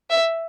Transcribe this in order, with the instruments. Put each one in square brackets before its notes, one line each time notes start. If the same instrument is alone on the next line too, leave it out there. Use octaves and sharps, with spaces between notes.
[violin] E5